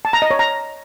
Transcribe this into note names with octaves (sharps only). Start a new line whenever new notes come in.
A5
A#5
D#5
C#5
A#5